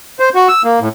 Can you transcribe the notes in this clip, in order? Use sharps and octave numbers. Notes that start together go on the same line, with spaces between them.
C5
F#4
E6
A#3
A2